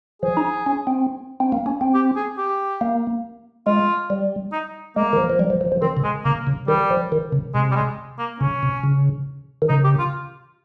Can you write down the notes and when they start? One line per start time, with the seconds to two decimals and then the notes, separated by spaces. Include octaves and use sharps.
0.23 F3 G#4
0.37 D#4
0.66 C#4
0.87 C4
1.40 C4
1.52 A#3
1.66 C#4
1.81 C4
1.94 G4
2.16 G#4
2.38 G4
2.81 A#3
3.67 G#3 F4
4.10 G3
4.53 D#4
4.96 G#3 A#3
5.13 D#3
5.17 F3
5.30 F3
5.39 G3
5.50 F3
5.61 F3
5.72 F3
5.82 D#3 C4
5.97 C#3
6.04 G#3
6.25 C#3 A#3
6.47 C#3
6.68 D#3 G3
6.90 F3
7.12 D#3
7.32 C#3
7.55 C3 G#3
7.72 G3
7.75 G#3
8.19 A#3
8.41 C#3 C#4
8.63 C3
8.83 C#3
9.62 D#3
9.69 C#3 D#4
9.84 G4
9.99 F4